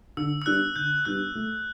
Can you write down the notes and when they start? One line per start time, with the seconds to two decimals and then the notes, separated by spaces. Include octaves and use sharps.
0.17 D3 E6
0.42 E6
0.46 G3 B3 D4 F#6
0.76 D3 G6
1.05 G3 B3 D4 F#6
1.35 A3